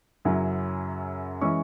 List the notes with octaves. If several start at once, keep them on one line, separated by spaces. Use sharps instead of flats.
F#2 C#3 F#3 C#4 E4
E3 G#3 C#4 C#6